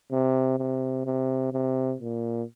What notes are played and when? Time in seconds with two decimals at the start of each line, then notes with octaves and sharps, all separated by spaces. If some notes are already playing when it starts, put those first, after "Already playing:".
0.12 C3
0.59 C3
1.06 C3
1.53 C3
2.01 A#2